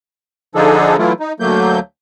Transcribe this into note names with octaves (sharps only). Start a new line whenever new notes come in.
D3 F3 D4 D#4 G#4 A4
E3 F#3 A3 E4 F4
D#4
D2 F#3 A3 A#3 G6